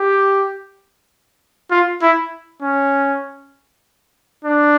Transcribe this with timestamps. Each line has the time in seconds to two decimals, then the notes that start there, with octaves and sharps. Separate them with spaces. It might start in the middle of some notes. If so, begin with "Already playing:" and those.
Already playing: G4
1.71 F4
2.02 E4
2.62 C#4
4.44 D4